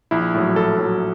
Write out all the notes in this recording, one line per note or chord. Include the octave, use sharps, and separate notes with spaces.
A#1 E4
A2 F#3
A#1 A4
A2 F#3